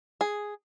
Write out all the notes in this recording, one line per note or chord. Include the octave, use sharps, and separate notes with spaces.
G#4